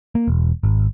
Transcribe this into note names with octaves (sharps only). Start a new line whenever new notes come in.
A#3
E1
G#1